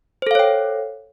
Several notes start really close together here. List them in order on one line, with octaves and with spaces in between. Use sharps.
C5 A4 F5 C#5 G5